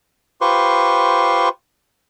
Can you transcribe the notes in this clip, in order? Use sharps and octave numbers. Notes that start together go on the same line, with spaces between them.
F4 G4 B4 C5 C6 C#6